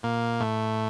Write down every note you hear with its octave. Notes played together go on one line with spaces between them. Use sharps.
A#2 A#3
A2 A3